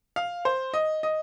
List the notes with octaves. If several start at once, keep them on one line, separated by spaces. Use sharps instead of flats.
F5
C5
D#5
D#5